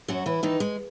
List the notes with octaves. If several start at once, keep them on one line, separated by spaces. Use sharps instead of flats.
F#2 F#3 F#4
E3 E4
D#3 E3 D#4
G#3